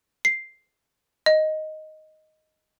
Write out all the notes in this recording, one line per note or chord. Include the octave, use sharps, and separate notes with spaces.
C7
D#5